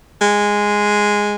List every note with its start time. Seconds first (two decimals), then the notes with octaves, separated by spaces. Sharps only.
0.22 G#3